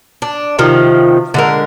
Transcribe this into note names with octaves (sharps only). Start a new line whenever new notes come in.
D4
C3 D#3 F3
D3 G#3 A#4